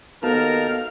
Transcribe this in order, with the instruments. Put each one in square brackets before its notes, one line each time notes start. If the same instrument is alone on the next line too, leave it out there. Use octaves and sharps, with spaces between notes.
[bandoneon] D#2 D#4 A5 [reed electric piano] B3 F#4 A4 [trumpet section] A#4 [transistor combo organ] F5